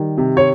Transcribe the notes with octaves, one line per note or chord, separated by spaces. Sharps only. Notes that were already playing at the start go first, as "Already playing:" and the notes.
Already playing: D#3 G3
C3
C#5